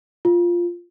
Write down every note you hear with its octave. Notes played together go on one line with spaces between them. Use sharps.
F4